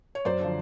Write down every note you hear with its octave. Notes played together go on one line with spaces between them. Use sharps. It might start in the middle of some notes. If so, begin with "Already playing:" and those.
C#5
F#2 C5 D5
D3 F3